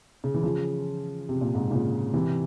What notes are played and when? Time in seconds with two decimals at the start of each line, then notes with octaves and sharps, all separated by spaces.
0.24 C#3
0.34 E3
0.43 C#3 F3
1.29 C3
1.41 A#2
1.55 G#2 C3
1.71 A#2 C#3
2.14 C3 E3